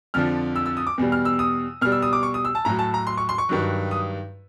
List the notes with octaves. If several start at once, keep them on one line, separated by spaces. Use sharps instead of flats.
F2 D3 F3 F6
E6
E6
D#6
D6
E2 B2 G3
F6
E6
D#6
B2 G3 F6
E6
D#6
D6
C#6
D#6
E6
A5
A2 F#3 A#5
A5
A#5
C6
C#6
C6
C#6
G2 D#3 F#3
D#6